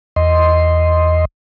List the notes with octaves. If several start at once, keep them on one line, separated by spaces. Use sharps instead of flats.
E2 D#5 C6